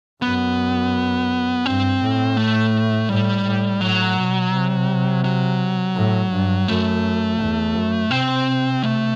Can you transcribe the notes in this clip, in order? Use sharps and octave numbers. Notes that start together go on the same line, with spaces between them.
F#2 B3
G2 C4
A2
A3
A2 G3
A2
A2 F#3
B2
C3
F#3
A2
G2
F#2 A3
E2
F#2
C3 C4
A3